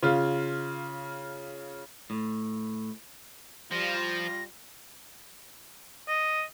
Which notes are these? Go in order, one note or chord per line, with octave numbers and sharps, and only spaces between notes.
C#3 F4
A2
F3 G3 F4 A#6
D#5